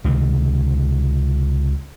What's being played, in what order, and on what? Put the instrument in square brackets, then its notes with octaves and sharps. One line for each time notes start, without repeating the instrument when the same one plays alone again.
[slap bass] C#2 C3 D#3